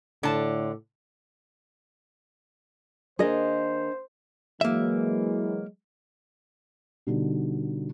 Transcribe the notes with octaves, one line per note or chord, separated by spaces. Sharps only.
A2 D3 A5
D#3 A#3 D4 G#4 C5 D#5
E3 F#3 G#3 A#3 E5
B2 D3 G3 D#4